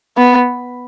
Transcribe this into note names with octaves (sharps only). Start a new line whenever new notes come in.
B3